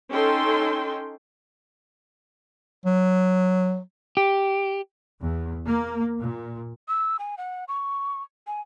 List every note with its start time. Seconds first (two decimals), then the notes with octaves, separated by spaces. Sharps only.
0.11 C#4 D#4 A4 G5 C6
2.86 F#3
4.17 G4
5.22 E2
5.67 A#3
6.20 A#2
6.88 E6
7.19 G#5
7.38 F#5
7.68 C#6
8.47 G#5